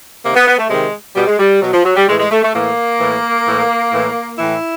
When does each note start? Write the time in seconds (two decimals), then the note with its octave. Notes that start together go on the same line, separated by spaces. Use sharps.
0.24 C3 D#3 A#3
0.35 B3
0.47 B3
0.59 A3
0.69 C3 D#3 G#3
1.16 B2 G3
1.27 G#3
1.39 G3
1.62 B2 F#3
1.74 F3
1.85 F#3
1.97 G3
2.08 A2 E3 G#3
2.19 G#3
2.31 A3
2.43 A3
2.54 A2 E3 A#3
3.00 A2 E3
3.47 A2 E3
3.93 A2 E3
4.38 A2 E3 E4